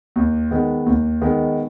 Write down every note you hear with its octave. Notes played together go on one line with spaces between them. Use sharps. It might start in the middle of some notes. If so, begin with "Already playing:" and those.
D#2
D#3 G#3 B3
D#2
D#3 G#3 B3